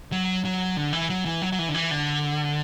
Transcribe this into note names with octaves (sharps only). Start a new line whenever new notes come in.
F#3
F#3
D3
E3
F#3
E3
F#3
F#3
E3
D3
E3
D3